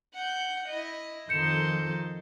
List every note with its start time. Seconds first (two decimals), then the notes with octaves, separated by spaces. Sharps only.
0.14 F#5 G6
0.67 E4 D#5
1.29 F2 D#3 D#4 A4 C6 G6 C#7 E7